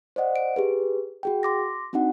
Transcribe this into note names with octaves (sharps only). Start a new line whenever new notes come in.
C5 D5 D#5 F#5
D7
G4 G#4 B4
F#4 G#4 G5
C6 D6 A#6
C4 D4 D#4 F#4 F#5